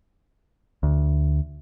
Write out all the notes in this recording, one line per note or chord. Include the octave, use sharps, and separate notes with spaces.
D2